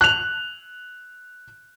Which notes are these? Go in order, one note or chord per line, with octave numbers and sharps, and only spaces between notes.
F#6 F7